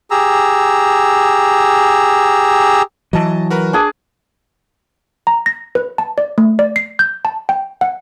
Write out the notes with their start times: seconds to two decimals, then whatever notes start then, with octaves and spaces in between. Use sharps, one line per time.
0.11 G4 G#4 A#5 E6
3.13 E3 F#3 D#5 A5
3.50 F#4 A#4 B4
3.73 D4 G#4 A5
5.27 A#5
5.46 A#6
5.75 B4
5.98 A5
6.18 D5
6.38 A3
6.59 D5
6.76 C7
6.99 G6
7.25 A5
7.49 G5
7.81 F#5